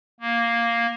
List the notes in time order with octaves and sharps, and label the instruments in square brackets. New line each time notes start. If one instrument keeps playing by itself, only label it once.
[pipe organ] A#3